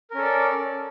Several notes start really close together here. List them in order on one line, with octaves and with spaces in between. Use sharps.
A#4 C#4 A4 D5